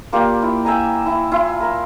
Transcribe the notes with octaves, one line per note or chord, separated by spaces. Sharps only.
A#3 F4 G4 D5
E4
E5 G5 G#5 A#5
E4
E4 F4
A#4